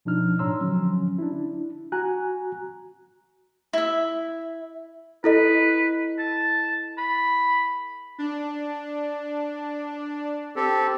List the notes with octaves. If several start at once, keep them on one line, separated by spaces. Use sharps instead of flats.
B2 F3 D4 D#4 F6
A2 D4 C#5 A#5 C6 E6
D3 F3 F#3 C#4
D4 E4
F#4 G#5 A#5 F#6
E4 E5
E4 A4 B4 D#5
A5
B5
D4
C4 G4 A4